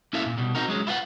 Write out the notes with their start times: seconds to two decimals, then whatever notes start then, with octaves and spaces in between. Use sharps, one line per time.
0.13 A#3 C#4 E4 A4 E5 F5
0.26 A#2
0.37 B2 G3
0.55 C4 D#4 F#4 A#4
0.68 F#3 G#3 C#4
0.87 E4 F4 B4 F#5